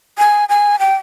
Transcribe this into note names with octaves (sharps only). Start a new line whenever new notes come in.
G#5
G#5
G5